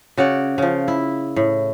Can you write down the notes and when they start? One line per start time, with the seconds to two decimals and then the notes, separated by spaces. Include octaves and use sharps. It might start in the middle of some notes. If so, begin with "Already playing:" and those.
0.17 C#3 F#4 C#5 D5
0.58 C#3 F3
0.88 E4
1.36 A2